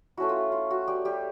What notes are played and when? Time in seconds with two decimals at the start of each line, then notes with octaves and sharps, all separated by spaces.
0.17 A3 C#4 E4 F#4
0.29 F4
0.52 F4
0.71 F#4
0.88 G3 G4
1.05 G3 G4